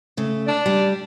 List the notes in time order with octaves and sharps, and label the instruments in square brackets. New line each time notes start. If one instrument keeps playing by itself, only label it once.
[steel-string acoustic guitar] C#3 A3
[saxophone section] D4 D5
[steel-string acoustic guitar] G3